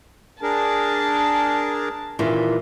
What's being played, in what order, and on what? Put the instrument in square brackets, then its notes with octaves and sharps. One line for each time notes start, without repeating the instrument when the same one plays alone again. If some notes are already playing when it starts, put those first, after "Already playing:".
[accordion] D4 G#4 A#4 [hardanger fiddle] A5
[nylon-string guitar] D#2 A#2 E3 [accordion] C#4